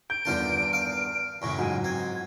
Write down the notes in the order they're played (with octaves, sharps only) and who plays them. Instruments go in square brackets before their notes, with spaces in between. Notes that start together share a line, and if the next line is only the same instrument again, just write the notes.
[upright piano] G6 [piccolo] D7
[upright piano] E2 G2 D#3 [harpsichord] D3 F4 A5
[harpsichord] F5
[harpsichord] F#2 A2 C#3 [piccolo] C#6
[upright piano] G#2 F3 F#3 [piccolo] G#5
[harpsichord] C4 [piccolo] G#6